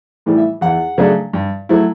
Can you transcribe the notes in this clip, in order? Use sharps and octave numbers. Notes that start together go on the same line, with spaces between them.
A2 E3 G3
E5
E2 F#5
C#3 F#3 A3 D4
G2
F#3 A3 E4